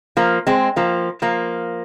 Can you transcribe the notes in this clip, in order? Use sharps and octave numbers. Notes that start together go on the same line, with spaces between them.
F3 A#3
G#3 C4
F3 A#3
F3 A#3